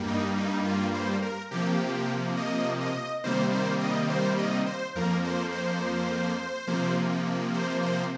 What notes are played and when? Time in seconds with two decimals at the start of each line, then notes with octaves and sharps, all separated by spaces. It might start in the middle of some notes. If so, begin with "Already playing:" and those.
Already playing: G2 G3 A#3
0.08 D#4
0.37 D#4
0.65 F4
0.94 C5
1.22 A#4
1.51 C3 F3 A#3 G4
2.37 D#5
2.81 D#5
3.24 C3 D#3 G3 A#3 C5
3.52 C5
3.81 D#5
4.10 C5
4.38 D#5
4.66 C5
4.95 F2 F3 A#3 A#4
5.24 C5
5.52 C5
6.67 C3 F3 A#3
7.54 C5
7.83 C5